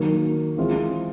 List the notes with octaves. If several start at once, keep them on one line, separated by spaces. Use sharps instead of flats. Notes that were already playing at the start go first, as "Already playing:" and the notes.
Already playing: D#3 F#3 A#3
E3 G#3 C4 F4